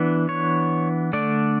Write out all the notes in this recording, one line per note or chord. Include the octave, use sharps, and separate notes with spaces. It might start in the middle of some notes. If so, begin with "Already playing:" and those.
Already playing: E3 B3 D4
C#5
D3 A3 D4 D5